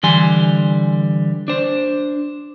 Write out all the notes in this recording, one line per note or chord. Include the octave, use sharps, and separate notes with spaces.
D3 E3 G3 G#5 C6
D4 C5